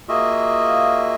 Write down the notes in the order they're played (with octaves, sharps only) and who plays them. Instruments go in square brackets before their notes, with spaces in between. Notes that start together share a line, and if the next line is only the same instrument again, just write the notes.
[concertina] A#3 F4 F#4 G#4 D#5 E5